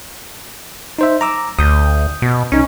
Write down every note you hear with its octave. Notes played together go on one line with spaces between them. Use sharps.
D#4 C5 E5
A#5 D6 E6
D2 D#6 G6
B2
C2 C#4 D#4